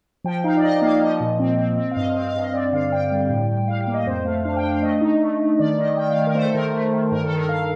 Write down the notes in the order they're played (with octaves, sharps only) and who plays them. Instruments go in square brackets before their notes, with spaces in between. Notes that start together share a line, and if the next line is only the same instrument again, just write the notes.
[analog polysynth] F3 G5
D#4 F5
D5
D#4 D#5
A#3 F5
F3 D#5
A#2
C4
C4
C4
F5
G2 D#5
C4 F5
F5
G2
D#5
C4 D5
D3 F5
D3 G5
G3
A2
A2
G3 F5
F5
A#3
D#5
F2 C5
A3 F5
D4 F5
G5
D4
F5
A3 D#5
D#4
A3
A3
D#3 D5
D#3 D#5
D#3 G5
F5
D#3
A#4
A3 C5
A4
D#3 A#4
A3
D#3
G2 A#4
A4
D#3
A#4
G2 F5